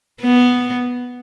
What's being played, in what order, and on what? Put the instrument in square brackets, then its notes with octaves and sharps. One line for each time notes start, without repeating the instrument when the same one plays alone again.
[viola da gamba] B3